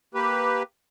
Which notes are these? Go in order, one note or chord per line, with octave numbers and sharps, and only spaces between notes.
A#3 G4 B4